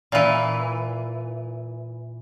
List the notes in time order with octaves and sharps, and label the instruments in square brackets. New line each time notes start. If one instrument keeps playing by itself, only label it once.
[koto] A#2 E3